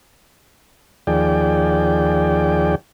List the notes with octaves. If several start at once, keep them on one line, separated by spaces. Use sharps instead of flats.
D#2 F3 G#4 D5 G5